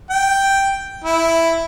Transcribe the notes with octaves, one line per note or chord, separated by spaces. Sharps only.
G5
E4